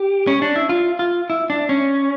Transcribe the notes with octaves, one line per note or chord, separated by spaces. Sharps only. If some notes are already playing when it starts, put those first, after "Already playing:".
Already playing: G4
C#4
D4
E4
F4
F4
E4
D4
C#4